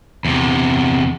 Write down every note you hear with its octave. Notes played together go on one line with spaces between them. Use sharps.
E2 C3